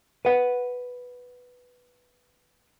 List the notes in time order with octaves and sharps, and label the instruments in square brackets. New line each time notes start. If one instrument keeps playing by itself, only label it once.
[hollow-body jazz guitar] B4 F#5